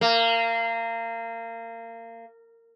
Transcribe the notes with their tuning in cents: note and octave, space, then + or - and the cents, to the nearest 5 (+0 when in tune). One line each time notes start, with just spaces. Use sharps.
A#3 -25